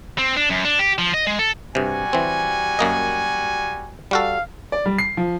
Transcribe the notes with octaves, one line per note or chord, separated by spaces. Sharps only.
C4
D4
F#2
D4
G4
F3
D#5
G#3
A4
G2 C3 G3 F#4 G#5
E3 C4
F#2 A#3 D#5
G3 F#4 A4 F5
D5
G3
C7
F3